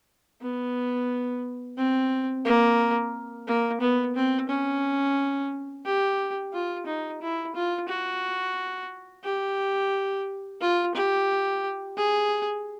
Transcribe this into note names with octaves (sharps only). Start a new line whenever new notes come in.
B3
C4
A#3
A#3
B3
C4
C#4
G4
F4
D#4
E4
F4
F#4
G4
F4
G4
G#4